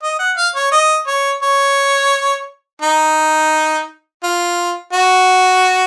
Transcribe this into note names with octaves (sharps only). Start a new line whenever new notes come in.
D#5
F#5
F5
C#5
D#5
C#5
C#5
D#4
F4
F#4